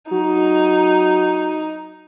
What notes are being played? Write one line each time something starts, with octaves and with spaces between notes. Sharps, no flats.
F#3 D#4